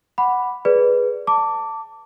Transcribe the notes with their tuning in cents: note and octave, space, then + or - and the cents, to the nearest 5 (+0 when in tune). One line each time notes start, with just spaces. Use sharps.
F#5 +0 B5 +0 D6 +0
G#4 +0 B4 -5 D5 -5
A5 +20 D6 -15